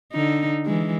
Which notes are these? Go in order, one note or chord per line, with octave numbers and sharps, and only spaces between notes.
D3 D#4
E3 G#3